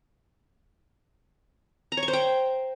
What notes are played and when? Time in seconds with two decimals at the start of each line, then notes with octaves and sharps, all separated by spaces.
1.92 A#5
1.97 C#5
2.03 C#6
2.08 C5
2.13 G5